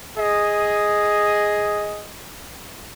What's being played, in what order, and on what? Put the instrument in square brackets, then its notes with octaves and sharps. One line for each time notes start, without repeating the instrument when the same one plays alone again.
[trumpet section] G#4 D#5